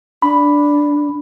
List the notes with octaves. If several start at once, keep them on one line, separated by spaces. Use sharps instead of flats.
D4 B5